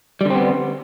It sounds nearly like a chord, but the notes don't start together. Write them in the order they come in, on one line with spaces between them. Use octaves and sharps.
G3 D3 C4 B3